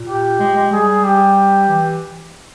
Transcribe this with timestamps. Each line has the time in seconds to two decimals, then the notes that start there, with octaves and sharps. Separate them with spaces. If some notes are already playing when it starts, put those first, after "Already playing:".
Already playing: A#2
0.09 G4
0.40 G#3
0.56 G#3
0.73 G3 G#4
1.05 G4
1.69 E3